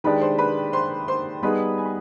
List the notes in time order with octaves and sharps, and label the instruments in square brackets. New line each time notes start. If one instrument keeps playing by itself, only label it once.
[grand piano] D#3 G#3 D4 G4 [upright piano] B4 B5
[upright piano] C5 C6
B4 B5
C5 C6
C5 C6
[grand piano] G3 B3 D#4 G#4 [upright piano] B4 B5
[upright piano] G#5
B5